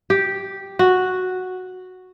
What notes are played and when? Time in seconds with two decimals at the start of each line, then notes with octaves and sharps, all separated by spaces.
0.10 G4
0.79 F#4